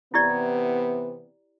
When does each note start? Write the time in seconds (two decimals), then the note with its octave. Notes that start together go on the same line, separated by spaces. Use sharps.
0.14 C3 E3 B3 E4 G4 D5